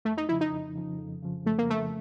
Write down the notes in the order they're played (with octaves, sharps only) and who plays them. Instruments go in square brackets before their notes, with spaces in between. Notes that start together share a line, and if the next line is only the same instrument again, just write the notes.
[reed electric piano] F2 [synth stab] A3
[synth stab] D#4
[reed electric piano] C#3 F3 [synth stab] E4
[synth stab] D#4
[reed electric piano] F2
C#3 F3
F2
C#3 F3
[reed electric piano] F2 [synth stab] A3
[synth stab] A#3
[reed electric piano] C#3 F3 [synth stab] A3